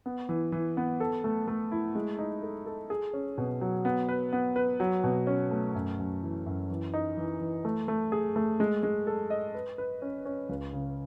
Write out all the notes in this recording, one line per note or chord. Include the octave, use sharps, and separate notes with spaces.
B3
E3
E3
B3
A4
A3
A3
E4
G#3
D#4
A4
A4
G#4
C#4
B2
F#3
B3
B4
B3
B4
F#3
B2
C#4
A3
F#2
F#2
E3
F#2
E3
D#4
E3
E3
A3
A3
G#4
A3
G#3
G#3
A4
D#5
B4
B4
C#4
C#4
C#2
C#3